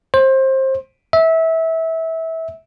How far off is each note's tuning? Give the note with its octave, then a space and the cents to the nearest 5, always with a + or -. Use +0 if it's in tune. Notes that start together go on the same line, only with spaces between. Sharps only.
C5 +25
E5 -20